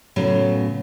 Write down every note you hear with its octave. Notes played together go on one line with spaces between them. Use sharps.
A2 C#3 F#3 B3